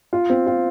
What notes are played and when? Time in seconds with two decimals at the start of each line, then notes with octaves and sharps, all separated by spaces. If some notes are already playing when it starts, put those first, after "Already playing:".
0.13 F4
0.30 C4
0.47 F4